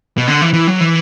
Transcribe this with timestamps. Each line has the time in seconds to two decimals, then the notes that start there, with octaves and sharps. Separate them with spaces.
0.18 B2
0.28 D3
0.41 E3
0.54 E3
0.67 F#3
0.80 E3